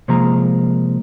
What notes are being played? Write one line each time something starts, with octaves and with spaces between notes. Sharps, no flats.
C3 F3 G#3 A#3 A#5